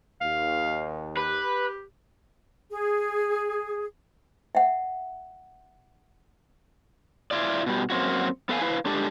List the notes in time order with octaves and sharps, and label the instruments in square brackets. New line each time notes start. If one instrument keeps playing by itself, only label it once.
[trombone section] D#2 [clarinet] F5
[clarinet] G4 [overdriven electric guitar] B4
[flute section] G#4
[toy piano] E5 F#5
[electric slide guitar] E4 F4 D5
B2 G3
F#2 A#3 C4 E4 F#4
B3 A4 B4 E5 F5 G#5
E4 B4 F5
G#3 D4 G4 A4